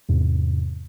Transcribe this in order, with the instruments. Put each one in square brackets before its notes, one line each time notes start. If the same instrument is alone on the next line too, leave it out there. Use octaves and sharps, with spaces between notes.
[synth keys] E2 G#2 C3